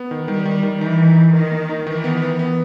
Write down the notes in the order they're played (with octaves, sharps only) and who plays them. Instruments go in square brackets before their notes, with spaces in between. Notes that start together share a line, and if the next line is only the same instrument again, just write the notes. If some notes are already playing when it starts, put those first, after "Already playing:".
Already playing: [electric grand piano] B3
D#3
[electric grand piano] D#3 [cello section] G3
[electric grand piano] D#3
D#3
[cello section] E3 [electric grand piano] D#4
[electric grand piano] D#4
D#4
[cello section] D#3 [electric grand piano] A#4
[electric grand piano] A#3
D#4
[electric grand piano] D#3 [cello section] E3
[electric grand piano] B3
B3
B3